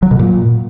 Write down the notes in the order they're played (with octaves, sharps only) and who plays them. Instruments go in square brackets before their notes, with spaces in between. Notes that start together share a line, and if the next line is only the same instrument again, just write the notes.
[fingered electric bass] F#3
B2
A#2